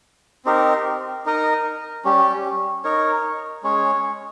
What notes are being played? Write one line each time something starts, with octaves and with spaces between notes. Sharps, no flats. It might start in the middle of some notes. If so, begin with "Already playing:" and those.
C4 D#4 G4 A#4
D#4 A#4 D#5
G3 C#4 G4
D#4 A#4 C#5
G#3 C#4 G#4 C#5